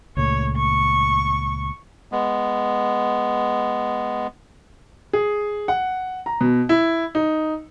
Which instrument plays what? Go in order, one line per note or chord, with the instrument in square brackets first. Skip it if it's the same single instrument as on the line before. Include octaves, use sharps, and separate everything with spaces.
[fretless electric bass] C#2 A#2 A3 [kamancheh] C#5
[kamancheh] C#6
[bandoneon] G#3 B3
[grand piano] G#4
F#5
A#5
B2
E4
D#4